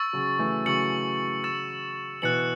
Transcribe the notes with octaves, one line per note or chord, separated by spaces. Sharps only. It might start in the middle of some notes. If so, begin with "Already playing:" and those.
Already playing: C#6 E6 A6
C#3 F#3
E3 A3
C#3 F#3 C#6 E6 C#7 F#7
C#6 E6 A6 E7
B2 E3 F#6 A6 C#7 F#7